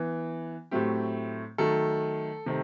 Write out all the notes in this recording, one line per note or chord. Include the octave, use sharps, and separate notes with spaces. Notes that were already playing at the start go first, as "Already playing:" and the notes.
Already playing: E3 B3
A2 F#3 A3 C4 G4
D#3 F#3 A3 A4
C3 D#3 A3